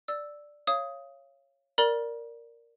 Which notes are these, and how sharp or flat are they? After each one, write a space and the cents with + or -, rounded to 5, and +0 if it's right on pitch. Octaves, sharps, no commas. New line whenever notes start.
D5 +0 E6 +0
C#5 -10 F5 -25 D#6 +15
A#4 +0 D5 -5 A#5 +45